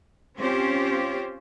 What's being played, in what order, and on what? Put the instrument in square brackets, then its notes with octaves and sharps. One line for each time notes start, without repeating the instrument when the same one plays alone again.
[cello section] C4 C#4 F4 G4 C5